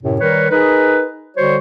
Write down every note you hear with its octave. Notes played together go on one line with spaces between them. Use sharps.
F#2 A2 C3
D#3 G3 A#4 B4 C#5
D#4 G#4 A#4 B4
D3 G3 F#4 C5 C#5